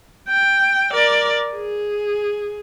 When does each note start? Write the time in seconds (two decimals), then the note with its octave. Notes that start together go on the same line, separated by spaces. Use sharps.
0.28 G5
0.92 A#4 D5
1.55 G#4